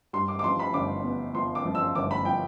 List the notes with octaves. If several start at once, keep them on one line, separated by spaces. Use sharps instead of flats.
G2 C6
D6
D6
F3 C6
B5
G1 D6
B3
F3 C6
D6
F3
E6
G1 D6
B5
F3 G5